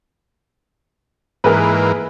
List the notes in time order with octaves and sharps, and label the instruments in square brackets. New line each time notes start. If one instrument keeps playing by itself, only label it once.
[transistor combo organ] G#2 E3 A#3 [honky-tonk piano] G#4 A#4 B4